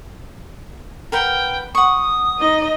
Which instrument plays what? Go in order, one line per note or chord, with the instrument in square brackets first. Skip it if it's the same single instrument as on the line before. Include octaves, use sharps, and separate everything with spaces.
[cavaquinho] A#4 B4 F#5 [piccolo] G5
[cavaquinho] F#5 C#6 [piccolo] D#6
[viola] D#4 D#5